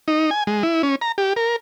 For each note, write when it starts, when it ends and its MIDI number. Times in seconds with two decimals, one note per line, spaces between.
0.08 0.30 63
0.31 0.44 80
0.47 0.63 56
0.63 0.82 64
0.83 0.95 61
1.01 1.12 82
1.18 1.33 67
1.36 1.56 70